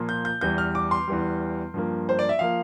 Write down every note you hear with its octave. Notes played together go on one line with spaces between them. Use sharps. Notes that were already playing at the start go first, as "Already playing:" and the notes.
Already playing: A#2 F3 A#3 F4
G6
G6
E2 E3 G3 G6
F6
D6
C6
E2 E3 G3
G2 F3 A#3
C5
D5
E5
F3 A#3 F5